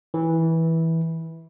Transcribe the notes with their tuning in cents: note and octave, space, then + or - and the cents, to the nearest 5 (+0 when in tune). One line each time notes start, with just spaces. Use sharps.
E3 -15